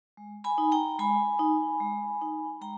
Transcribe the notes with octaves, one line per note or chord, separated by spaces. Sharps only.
G#3
G#5 B5
D#4
G5 A#5
G#3 G#5 B5
D#4
G#3
D#4
G#3 G5 A#5